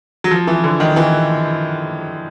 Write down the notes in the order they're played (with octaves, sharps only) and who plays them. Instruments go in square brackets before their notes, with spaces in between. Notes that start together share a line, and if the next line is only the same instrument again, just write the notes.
[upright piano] F#3
F3
E3
D3
D#3
E3